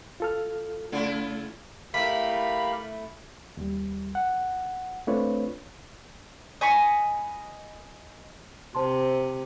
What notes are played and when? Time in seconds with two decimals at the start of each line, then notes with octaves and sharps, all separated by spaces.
0.20 F4 A4 F6
0.92 C#3 A3 E4 F4
1.94 A3 E4 G4 A#4 F5 B5
3.57 D#2 G3
4.15 F#5
5.07 A3 C4 D4 F4 B4 C#5
6.61 D#5 G#5 B5 C#6
8.75 C3 C5 A5 C6